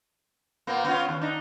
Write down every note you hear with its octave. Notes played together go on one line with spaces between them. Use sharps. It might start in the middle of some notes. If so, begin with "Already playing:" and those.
A#2 A#3 B3
B3 C#4 F4
D#2
D4 D#4